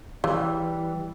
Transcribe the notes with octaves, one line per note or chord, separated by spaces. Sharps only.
C#3 E3 G3